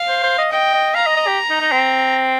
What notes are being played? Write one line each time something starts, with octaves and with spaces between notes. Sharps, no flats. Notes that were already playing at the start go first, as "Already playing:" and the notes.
Already playing: F5
C5
C5
D#5
D#5 G5
D#5
F5 A#5
D#5
D#5
G4
D#4
D#4
C4